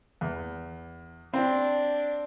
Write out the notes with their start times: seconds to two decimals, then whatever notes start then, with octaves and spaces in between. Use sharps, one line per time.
0.21 E2
1.34 C4 D4